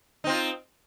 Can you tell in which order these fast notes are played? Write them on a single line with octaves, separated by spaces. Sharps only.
D#4 C4 F4